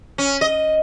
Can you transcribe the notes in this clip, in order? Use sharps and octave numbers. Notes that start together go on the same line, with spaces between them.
C#4
D#5